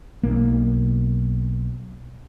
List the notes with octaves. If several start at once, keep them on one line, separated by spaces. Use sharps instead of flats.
B1 A#3